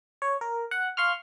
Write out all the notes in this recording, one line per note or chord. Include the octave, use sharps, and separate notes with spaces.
C#5
A#4
F#5
F5 C6 C#6 F6